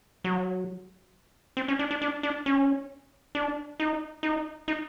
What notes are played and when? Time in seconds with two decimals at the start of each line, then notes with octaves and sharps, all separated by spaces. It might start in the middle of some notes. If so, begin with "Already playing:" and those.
0.24 F#3
1.57 C4
1.68 C#4
1.79 D4
1.91 D4
2.02 D4
2.23 D4
2.46 C#4
3.35 D4
3.80 D#4
4.23 D#4
4.68 D#4